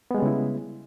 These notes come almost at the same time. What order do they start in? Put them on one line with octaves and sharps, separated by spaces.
B3 G#3 G3 C#3 E4